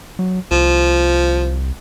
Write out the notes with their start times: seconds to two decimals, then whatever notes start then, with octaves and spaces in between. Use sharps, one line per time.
0.19 F#3
0.51 C2 F3